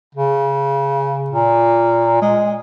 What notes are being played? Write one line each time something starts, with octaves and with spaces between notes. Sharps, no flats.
C#3
A#2
G#3